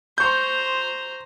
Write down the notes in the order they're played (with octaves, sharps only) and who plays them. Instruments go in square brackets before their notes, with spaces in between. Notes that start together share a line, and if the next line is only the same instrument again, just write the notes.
[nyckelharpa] C5 A#5 [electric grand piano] C6 C#6 G6